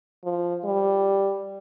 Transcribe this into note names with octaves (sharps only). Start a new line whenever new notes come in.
F3
G3